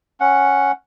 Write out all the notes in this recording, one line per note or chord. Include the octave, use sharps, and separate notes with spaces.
C#4 F#5